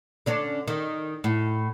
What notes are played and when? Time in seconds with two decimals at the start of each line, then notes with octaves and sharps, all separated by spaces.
0.26 D3 C#4 D4
0.68 D#3
1.24 A2